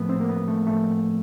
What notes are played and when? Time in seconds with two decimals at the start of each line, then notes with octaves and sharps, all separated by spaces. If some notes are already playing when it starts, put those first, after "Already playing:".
Already playing: A2 F3 A3 B3
0.09 C4
0.21 A#3
0.29 B3
0.48 A3
0.67 A2 F3 A3